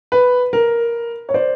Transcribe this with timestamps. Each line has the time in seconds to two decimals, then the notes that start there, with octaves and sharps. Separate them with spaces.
0.12 B4
0.53 A#4
1.29 C#5
1.34 C5 D5